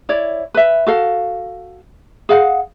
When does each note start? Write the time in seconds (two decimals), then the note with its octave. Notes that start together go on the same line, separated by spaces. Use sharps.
0.09 E4 C#5 D5
0.54 B4 E5
0.87 F#4 A4 F5
2.29 G#4 F5 F#5